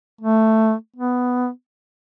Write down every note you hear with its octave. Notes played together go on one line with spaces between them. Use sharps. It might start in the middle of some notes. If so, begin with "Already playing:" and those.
A3
B3